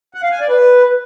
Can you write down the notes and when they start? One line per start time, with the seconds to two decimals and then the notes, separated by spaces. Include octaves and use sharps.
0.14 F#5
0.23 F5
0.32 G#5
0.40 D5
0.49 B4